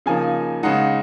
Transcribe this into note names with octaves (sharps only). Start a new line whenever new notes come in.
C#3 F3 A#3 D#4 G#5
C#3 G#3 D#4 F#5